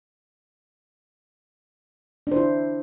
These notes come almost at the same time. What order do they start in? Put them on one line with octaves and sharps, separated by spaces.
D4 C5 E4